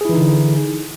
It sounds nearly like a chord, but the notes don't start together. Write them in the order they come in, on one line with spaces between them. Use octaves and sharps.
G#4 E4 E3 D#4 D3